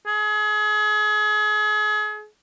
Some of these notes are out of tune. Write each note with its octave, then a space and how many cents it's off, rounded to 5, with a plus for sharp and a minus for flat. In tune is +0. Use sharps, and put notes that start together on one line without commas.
G#4 +35